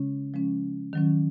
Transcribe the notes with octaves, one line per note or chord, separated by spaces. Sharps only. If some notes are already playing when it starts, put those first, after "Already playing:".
Already playing: C#3 G#3 C#4
F3 G#3 C#4
D#3 F#3 C#4